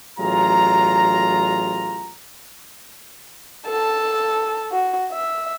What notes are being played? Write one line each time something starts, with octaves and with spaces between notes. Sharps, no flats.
A1 F#3 F4 G#4 A#5
A4 A5
F#4
E5